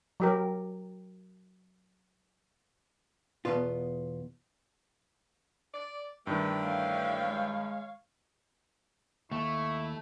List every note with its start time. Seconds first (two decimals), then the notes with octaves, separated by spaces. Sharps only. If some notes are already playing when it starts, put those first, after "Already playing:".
0.20 F#3 G4 A#4
3.45 E2 G#2 B2 B3 F4
5.74 D5
6.27 G2 D#3 E3 A3 D4 G4
6.61 A3 C#5 F5
7.27 G#3
9.32 D#2 A3 E4 C#6